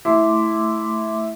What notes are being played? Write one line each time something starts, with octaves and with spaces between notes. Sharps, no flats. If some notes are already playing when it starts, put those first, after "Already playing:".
A3 E4 C6 D6